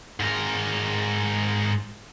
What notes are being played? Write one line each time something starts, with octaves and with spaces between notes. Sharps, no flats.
G#2 A#4